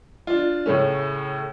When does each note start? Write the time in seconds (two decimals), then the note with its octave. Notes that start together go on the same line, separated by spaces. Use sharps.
0.27 D4 F4
0.66 A2 C#3 A3 C#4